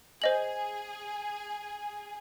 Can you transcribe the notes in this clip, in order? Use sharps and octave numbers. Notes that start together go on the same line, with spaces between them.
G#4 C5 D#5 F#7